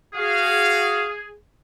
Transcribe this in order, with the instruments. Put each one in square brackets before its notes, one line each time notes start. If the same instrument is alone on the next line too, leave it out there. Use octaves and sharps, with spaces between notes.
[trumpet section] F#4 F5 [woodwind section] G#4